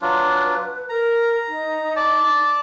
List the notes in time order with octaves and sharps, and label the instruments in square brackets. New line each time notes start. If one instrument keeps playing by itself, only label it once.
[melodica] F#3 D4 F4 [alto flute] B4
[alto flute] A#4 [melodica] A#5
[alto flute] D#4
[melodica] D5 A5